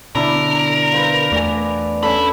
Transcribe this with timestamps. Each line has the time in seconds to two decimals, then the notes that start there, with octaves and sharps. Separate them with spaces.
0.15 B2 D3 D4 E4 A#4 E5
0.92 B4 C5 F5
1.32 E2 A3 D5 G#5
2.03 C#4 D4 A4 E5 B5